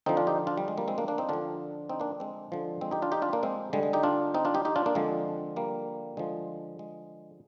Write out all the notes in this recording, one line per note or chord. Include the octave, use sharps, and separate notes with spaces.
D3 F3 C4 D#4
D4 F4
D#4 G4
D4 F4
G3
G#3
G3 A#3
G#3 C4
A#3 D4
A#3 D4
C4 D#4
D3 F3 D4 F4
C4 D#4
A#3 D4
G#3 C4
D3 F3
G#3 C4
D#4 G4
D4 F4
D#4 G4
D4 F4
A#3 D4
G#3 C4
D3 G3 G#3
G#3
D#4 G4
D4 F4
C4 D#4
D4 F4
D#4 G4
D#4 G4
D4 F4
A#3 D4
D3 F3 G#3 C4
G3 A#3
D3 F3 G#3
G#3